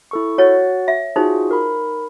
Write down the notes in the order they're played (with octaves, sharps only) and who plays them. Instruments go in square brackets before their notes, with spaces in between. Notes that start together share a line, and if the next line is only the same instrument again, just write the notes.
[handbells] E4 A4 C#6
[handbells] F#4 F#5 A6 [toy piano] C#5
[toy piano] E5
[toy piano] D#4 C5 [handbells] F4 F#4 G#4
[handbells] A#4 B5